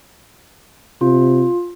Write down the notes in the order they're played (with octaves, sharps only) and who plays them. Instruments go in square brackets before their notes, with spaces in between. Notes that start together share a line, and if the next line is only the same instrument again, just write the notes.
[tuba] C3 [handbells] F4